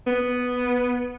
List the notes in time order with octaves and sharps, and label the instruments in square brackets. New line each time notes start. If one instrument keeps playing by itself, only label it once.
[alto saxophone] B3